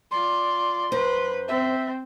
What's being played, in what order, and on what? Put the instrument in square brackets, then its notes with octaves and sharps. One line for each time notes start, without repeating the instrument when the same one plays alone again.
[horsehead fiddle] F4 D5 [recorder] C6
[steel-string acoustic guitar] F#2 C5 [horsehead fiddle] B4
[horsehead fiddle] C4 [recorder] E5